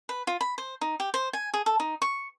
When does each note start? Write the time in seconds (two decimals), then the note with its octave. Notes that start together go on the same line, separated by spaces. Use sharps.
0.09 B4
0.27 F4
0.41 B5
0.58 C5
0.81 D#4
1.00 G4
1.14 C5
1.33 G#5
1.54 G#4
1.66 A4
1.80 D#4
2.02 C#6